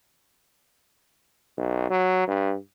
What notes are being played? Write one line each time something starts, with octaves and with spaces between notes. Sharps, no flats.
B1
F#3
G2